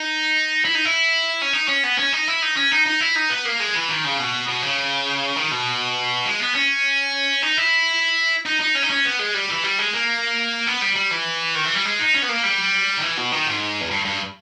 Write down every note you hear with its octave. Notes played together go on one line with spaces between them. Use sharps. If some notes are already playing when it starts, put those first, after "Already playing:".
Already playing: D#4
E4
D#4
E4
C#4
D#4
C#4
B3
C#4
D#4
E4
D#4
C#4
D#4
D#4
E4
D#4
B3
A#3
G#3
E3
D#3
C#3
B2
B2
C#3
D#3
B2
G#3
B3
C#4
D#4
E4
D#4
D#4
C#4
D#4
C#4
B3
G#3
G3
E3
G3
G#3
A#3
B3
G3
G3
E3
D#3
E3
G3
G#3
D#4
C#4
B3
A#3
G3
D#3
E3
B2
D#3
G#2
E2
G2
G2